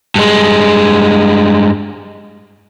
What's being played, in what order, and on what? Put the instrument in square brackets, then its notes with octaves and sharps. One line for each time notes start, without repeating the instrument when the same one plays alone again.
[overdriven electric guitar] G2 G#3